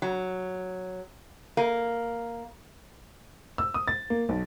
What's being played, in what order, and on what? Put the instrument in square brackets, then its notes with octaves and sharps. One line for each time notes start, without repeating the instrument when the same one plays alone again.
[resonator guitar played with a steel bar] F#3
A#3
[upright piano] E6
D#6
A6
A#3
B1